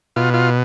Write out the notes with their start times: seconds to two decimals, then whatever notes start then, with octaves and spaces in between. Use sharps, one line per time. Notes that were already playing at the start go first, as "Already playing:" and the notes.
0.16 B2 F4
0.34 F4